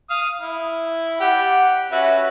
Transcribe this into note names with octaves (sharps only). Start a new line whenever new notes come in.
F5 D#6
E4
G4 D5 F#5
C#4 F#4 B4 E5